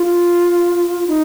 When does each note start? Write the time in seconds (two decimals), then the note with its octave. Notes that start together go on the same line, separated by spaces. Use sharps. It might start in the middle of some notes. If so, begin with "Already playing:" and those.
Already playing: F4
1.07 D#4